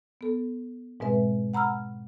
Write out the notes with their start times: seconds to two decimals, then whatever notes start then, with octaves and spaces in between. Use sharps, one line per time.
0.21 B3 A4
1.00 G#2 B2 G#3 C4 B4 E5
1.54 F#5 A#5 B5 E6 F6